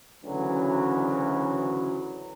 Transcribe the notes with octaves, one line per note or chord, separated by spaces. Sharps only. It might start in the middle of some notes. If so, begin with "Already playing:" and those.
D2 C#3 E3 F#3